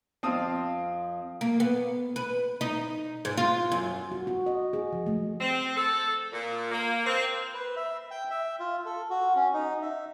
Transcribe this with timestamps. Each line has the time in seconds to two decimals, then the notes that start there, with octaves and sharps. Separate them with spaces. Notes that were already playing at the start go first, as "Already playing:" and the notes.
0.23 F2 C4 F5 A5 D#6
1.41 A#3
1.60 B3
2.16 B4
2.61 D#4
3.25 G#2
3.37 F4
3.72 F#2
4.12 F#4
4.27 F#4
4.46 D#5
4.73 G#4
4.92 F3
5.06 A3
5.41 C4
5.76 A4
6.32 A#2
6.72 A#3
7.06 C4
7.54 B4
7.76 E5
8.11 G5
8.30 E5
8.60 F4
8.85 A4
9.10 F#4
9.36 C#4
9.53 D#4
9.82 E5